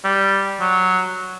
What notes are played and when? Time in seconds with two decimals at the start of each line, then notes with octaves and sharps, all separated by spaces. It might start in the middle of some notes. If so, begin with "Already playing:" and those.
0.04 G3
0.61 F#3